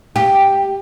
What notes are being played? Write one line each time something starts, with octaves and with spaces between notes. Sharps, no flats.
G4